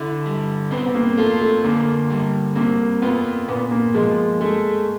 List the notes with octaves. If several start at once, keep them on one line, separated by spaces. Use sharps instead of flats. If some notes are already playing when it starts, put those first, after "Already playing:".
Already playing: D3 E4
G3
B3 C4
B3
A#3
A3 F4
A3
D3 A#3
G3
A#3 C4
B3 F4
A#2 B3
A#3
F3 G#3
G#3 A3